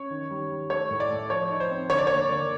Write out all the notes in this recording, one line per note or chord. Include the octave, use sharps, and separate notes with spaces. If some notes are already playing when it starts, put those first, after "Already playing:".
Already playing: C#4 C#5
D#3
G3
G3
A3 C#5
A2
D5
A3
F3 C#5
D#4
C5
C4
D3 C#5
D5
A#3 C#5
D3